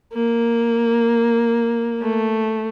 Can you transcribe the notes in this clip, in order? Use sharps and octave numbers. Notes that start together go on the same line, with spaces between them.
A#3
A3